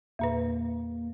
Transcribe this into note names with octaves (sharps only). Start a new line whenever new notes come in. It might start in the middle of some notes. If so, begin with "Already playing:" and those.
E2 A#2 A#3 B4